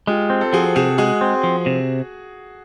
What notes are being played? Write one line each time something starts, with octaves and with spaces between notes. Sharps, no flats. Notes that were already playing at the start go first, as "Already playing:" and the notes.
G#3 F4 G4
C4
A4
F3 F#4 G#4
C3 F#4 G#4
G#3 F#4 G#4
C4
F3
C3